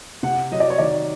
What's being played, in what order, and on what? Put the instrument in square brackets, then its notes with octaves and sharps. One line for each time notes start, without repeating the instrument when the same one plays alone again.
[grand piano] C3 [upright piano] F#5
[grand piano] F#3 [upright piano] D#5
[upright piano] D5
C#5
[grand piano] D#3 [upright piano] D5